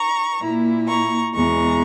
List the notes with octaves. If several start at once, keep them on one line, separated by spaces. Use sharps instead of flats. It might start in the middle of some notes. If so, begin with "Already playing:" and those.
Already playing: A#5 C#6
A#2 A#3 E4
A#5 C#6
E2 B2 G#3 A#5 C#6